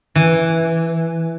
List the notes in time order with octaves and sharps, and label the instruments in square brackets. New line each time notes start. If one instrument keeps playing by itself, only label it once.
[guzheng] E3